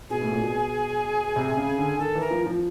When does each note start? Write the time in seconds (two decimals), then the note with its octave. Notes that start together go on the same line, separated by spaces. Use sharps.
0.10 B2 G#4
0.22 A2
0.32 A#2
0.41 B2
1.36 C3
1.51 C3
1.57 C#3
1.78 D3
1.99 D#3 A4
2.15 E3 A#4
2.30 F3
2.46 F3